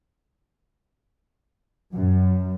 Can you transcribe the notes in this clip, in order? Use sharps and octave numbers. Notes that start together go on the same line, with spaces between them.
F#2